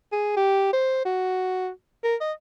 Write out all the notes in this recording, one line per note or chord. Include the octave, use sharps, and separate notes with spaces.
G#4
G4
C5
F#4
A#4
D#5